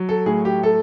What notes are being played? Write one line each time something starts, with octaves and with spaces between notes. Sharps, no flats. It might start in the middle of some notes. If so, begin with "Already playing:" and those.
Already playing: F#3
A4
A2 G#4
G4
A3 A4